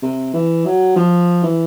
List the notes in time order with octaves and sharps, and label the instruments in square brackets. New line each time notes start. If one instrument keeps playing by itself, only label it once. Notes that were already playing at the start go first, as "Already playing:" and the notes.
[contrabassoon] C3
E3
F#3
F3
E3